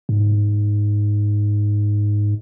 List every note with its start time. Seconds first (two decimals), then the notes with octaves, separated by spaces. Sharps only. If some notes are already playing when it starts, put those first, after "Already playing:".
0.09 G#2